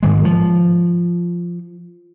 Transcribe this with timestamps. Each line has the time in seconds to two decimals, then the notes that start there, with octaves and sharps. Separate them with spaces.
0.03 G#2 D#3 G#3
0.25 F3